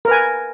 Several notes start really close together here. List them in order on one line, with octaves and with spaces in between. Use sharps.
A#4 B4 G#5